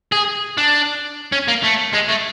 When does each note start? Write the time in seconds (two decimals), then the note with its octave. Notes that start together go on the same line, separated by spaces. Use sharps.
0.12 G#4
0.57 D4
1.32 C#4
1.48 A#3
1.63 A3
1.93 G#3
2.08 A3